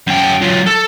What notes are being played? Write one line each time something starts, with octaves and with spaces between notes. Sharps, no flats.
F#2 G5
F#3 F4
A4